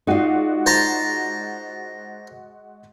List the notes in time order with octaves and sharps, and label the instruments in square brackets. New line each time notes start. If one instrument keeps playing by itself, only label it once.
[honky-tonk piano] G#3 F#4 D5 [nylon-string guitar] D#4 F4
[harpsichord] C5 A5 A#5